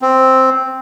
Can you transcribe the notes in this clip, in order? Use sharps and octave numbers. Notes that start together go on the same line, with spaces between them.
C4